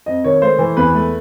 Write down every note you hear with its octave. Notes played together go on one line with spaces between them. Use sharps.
F2 D#5
D#3 C#5
A3 C5
E3
E2 B4
A3